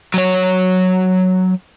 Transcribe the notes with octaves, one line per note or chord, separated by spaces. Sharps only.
F#3 C#5